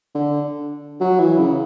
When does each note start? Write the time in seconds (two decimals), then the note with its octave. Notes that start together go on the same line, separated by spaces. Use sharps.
0.15 D3
1.00 F#3
1.19 E3
1.38 C#3